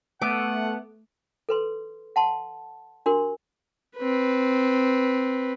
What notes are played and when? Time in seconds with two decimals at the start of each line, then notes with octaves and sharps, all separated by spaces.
0.22 A3 B3 F#5 D6
1.49 A4 B4 C6
2.16 F#5 A5 C6
3.06 D4 F#4 G4 A#4 C6
3.97 C4 B4